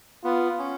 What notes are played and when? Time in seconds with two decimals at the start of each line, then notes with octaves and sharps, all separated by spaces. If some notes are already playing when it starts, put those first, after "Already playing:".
0.23 B3 F4
0.59 C#4